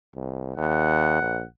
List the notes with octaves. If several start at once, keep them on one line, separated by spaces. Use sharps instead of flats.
C2
D#2 F#5
A#1